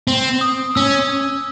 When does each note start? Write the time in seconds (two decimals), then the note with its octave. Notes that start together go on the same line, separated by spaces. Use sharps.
0.08 C4
0.41 D#6
0.75 C#4 E6